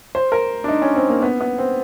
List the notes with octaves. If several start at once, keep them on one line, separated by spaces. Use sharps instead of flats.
C5
A#4
D4
D#4
C#4
C4
A#3
B3
B3
C4